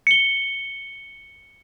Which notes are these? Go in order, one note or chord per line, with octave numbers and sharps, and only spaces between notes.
C#7 G7